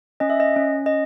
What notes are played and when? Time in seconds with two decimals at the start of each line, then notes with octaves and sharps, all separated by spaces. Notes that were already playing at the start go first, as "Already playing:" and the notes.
0.20 C#4 D#5
0.30 E5
0.40 D#5
0.56 C#4
0.86 D#5